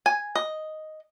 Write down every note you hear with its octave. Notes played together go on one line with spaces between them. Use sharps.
G#5
D#5